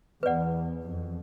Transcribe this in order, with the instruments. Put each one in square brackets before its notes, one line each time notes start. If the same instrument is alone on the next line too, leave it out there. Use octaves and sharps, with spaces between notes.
[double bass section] E2 [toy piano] B4 D5 F#5
[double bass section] F2